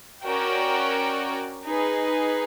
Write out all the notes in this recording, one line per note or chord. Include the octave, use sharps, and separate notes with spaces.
C#4 F#4 A#4 D5 G5
D#4 G#4 B4